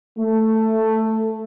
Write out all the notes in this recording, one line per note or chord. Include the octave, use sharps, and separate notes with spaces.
A3